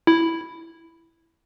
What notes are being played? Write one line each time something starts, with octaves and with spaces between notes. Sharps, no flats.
E4